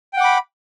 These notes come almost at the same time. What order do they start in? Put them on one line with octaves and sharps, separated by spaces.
G5 F#5 D6 B5